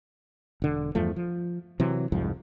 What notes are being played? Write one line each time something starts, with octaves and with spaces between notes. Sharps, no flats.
E1 D3
E2 G2 F3 A3
F3
C3 E3 F#3
C2 F2 G#2 F3